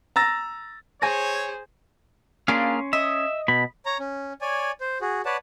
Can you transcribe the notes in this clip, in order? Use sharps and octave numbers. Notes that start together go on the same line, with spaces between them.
A#5 E6 A6 A#6
G#4 C5 C#5 G#5 G#6 A#6
A#3 C#4 D4 F4 G#4 F5 C6
D#5 E5
B2 B5
C#5 A#5
C#4
C#5 D5 G#5
C5
F#4 G#4
B4 C#5 D5 F#5 A5